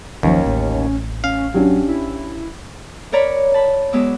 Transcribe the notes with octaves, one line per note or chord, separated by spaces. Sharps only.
F#1 D#2 D#3 F3 C#4
A1
C#4 F5
F#3 C#4 D4 G4
E4
A#4 C#5 D5 A#5 B5
A5 B5
F#3 G#3 B3 D6 E6